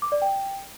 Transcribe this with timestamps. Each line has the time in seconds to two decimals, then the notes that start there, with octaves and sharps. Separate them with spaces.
0.02 D6
0.12 D5
0.22 G5